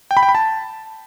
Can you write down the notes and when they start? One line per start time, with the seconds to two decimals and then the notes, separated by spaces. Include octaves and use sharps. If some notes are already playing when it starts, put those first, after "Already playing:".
0.11 G5
0.17 B5
0.23 G5
0.29 B5
0.35 A5